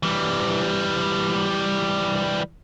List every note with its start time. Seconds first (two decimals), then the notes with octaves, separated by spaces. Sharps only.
0.03 E3 G3